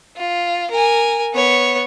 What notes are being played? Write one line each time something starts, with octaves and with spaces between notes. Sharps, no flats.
F4
A#4 G#5
B3 C#5